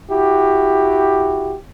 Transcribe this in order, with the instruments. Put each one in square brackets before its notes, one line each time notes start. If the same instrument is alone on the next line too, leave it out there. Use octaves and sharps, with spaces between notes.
[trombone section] E4 F#4 G4